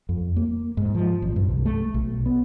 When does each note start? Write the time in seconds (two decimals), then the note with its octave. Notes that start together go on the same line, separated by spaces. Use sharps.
0.09 F2
0.36 A#3
0.77 G#2
0.95 F3
1.22 A1
1.36 G2
1.49 C2
1.65 A3
1.94 B1
2.26 B3